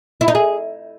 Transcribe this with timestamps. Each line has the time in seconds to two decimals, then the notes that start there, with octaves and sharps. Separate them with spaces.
0.21 E4
0.28 D#4
0.35 G#4